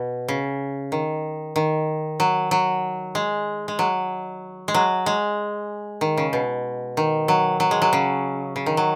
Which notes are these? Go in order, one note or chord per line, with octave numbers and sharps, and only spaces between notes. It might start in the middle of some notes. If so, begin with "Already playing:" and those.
Already playing: B2
C#3
D#3
D#3
F#3
F#3
G#3
G#3
F#3
G#3
F#3
G#3
D#3
C#3
B2
D#3
F#3
F#3
G#3
F#3
C#3
C#3
D#3
F#3